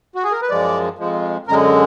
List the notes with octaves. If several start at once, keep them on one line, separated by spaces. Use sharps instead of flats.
F#4
G#4
A#4
B4
F#2 F3 G#3 D5
F2 F3 G#3
F#2 D3 G#3 A#4